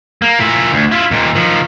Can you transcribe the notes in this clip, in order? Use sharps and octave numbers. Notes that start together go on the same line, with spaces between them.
A#3
A#2 E4
D2
E4 F4
D#2 A#2
D#3 F3